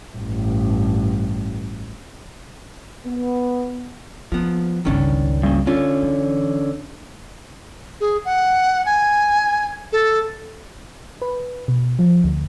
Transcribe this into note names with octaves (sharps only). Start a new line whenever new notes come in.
A1 G2
B3
F3 A#3 B3
G1 C#2 D#3 C#4 D4
G2 A#2 C#3
D3 C#4 F4
E3
G#4
F#5
G#5
A4
B4
B2
F3
D2